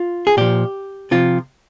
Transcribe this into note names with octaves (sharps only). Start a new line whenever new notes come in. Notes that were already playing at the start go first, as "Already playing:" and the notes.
Already playing: F4
G#4
A#2 F3 G4
C3 F3 F4